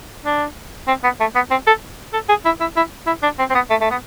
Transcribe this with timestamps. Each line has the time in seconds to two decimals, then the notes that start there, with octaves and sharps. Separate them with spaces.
0.25 D4
0.88 C4
1.03 B3
1.20 A3
1.35 B3
1.51 C4
1.67 A4
2.13 A4
2.29 G#4
2.45 E4
2.60 E4
2.76 E4
3.07 E4
3.23 D4
3.39 C4
3.50 C4
3.55 B3
3.70 A3
3.81 A3
3.91 B3